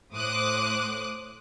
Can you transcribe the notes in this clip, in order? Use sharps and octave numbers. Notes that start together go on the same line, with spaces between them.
A2 C5 D6 D#6 F#6